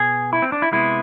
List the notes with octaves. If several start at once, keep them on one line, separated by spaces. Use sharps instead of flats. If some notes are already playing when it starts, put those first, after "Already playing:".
Already playing: B2 B3 G#4
E4
C4
D4
E4
C3 G#3 B3 E4